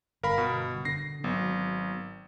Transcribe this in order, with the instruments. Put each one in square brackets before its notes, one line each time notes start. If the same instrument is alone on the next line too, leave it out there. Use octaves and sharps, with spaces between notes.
[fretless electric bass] G1 [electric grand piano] A#4 F5 B5
[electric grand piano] B2
[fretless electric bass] D3 [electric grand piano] A#6 C7
[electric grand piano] G#1 [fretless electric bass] F#3 B3